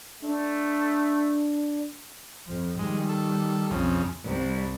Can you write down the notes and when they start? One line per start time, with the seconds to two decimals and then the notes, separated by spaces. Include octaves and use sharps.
0.22 A3 D4
2.47 F2 F3
2.79 D#3 G3 G#3
3.09 A4
3.71 B1 F2 C#3 C4
4.24 C2